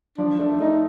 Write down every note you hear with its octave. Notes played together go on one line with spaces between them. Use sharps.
F3 D4
A3 D4
A3 D#4